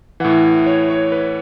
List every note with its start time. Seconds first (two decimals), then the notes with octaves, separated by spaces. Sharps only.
0.20 A2 E3 F#5
0.66 C#5
0.90 C#5
1.12 B4